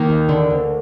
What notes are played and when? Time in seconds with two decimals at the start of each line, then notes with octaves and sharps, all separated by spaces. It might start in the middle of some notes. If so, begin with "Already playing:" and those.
Already playing: D#3 A#3
0.09 D#2
0.29 D3
0.50 D2